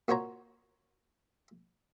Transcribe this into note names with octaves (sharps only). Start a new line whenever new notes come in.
A#2 F#4 C5 C#5 A#5